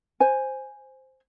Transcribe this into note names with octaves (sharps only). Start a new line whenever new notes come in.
C5 G#5